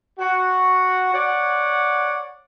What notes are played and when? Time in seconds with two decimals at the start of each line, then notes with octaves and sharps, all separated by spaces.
0.19 F#4
1.14 C#5 D5 F#5